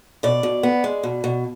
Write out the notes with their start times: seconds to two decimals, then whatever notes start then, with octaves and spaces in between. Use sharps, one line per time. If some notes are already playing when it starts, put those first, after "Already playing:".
0.23 B2 D5
0.43 B2
0.63 B3
0.84 G#3
1.03 B2
1.24 B2